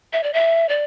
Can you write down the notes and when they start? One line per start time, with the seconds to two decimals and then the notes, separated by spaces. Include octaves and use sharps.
0.13 E5
0.23 D5
0.33 E5
0.69 D5